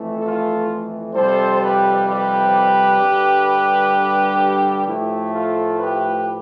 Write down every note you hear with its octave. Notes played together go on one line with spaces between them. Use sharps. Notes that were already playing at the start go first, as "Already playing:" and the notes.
Already playing: F2 E3 A3
F4 A4
F2 C3 G3 A4 C5
G4 B4
G4 B4
G2 D3 G3
A2 F3 A3 E4 G4
F4 A4
G4 B4